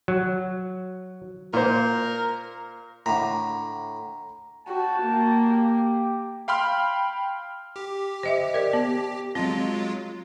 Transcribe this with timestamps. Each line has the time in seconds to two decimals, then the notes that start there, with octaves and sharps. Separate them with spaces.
0.08 F#3
1.53 A#2 A#4 C5
3.06 A2 D3 A#5
4.67 F#4 G5 A5
5.03 A#3
5.47 G4
6.48 F5 G5 B5 C6 F6
7.76 G4
8.23 C5 D#5 E5
8.54 A#4 D5
8.73 B3
9.35 F#3 G#3 C4 F4